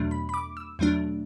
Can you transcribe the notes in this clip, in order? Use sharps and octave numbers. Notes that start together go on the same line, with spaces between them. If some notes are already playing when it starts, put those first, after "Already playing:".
Already playing: E2 B2 F#3 A3 D4
B5
B5
D6
E6
E2 B2 F#3 A3 D4